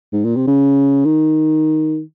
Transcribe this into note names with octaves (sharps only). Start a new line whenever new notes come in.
G#2
A#2
C3
C#3
D#3